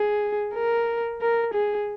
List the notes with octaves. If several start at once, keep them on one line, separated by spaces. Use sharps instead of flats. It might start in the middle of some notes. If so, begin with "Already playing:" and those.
Already playing: G#4
A#4
A#4
G#4